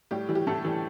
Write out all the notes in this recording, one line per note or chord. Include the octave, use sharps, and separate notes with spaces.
A2 G3 G4
E3 G3
G4
A2 A3 A4
E3 G3